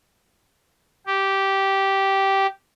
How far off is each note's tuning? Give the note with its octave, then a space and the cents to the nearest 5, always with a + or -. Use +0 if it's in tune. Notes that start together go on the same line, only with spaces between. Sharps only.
G4 -10